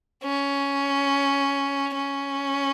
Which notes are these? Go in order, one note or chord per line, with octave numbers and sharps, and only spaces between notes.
C#4
C#4